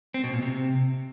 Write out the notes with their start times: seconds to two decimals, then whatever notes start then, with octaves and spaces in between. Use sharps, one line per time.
0.14 C4
0.24 B2
0.33 A#2
0.43 C3